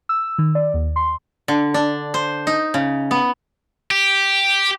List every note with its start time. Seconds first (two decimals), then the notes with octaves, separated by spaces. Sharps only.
0.09 E6
0.38 D#3
0.55 D5
0.74 D#2
0.96 C6
1.48 D3
1.74 D4
2.14 C5
2.47 D#4
2.74 C#3
3.11 B3
3.91 G4